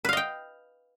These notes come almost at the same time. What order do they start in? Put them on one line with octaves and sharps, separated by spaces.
B4 F5 D#5 G5